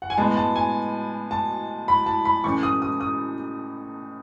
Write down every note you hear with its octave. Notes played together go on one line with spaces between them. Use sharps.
F#5
G#5
A2 G#3 B3 A5
A5
G#5
A5
B5
A5
B5
A2 E3 A3 C#4 C#6
D#6
D#6
D#6